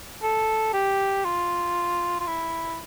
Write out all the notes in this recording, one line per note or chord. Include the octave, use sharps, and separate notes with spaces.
A4
G4
F4
F4
E4